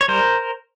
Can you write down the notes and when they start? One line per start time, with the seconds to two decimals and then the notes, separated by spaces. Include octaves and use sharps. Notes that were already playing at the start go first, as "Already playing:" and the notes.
0.01 C#5
0.08 G3 A#4 C5